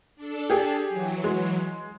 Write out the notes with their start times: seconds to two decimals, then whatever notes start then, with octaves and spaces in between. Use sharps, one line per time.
0.16 D4 A4
0.50 G4 G#4
0.89 E3 F#3
1.24 G#3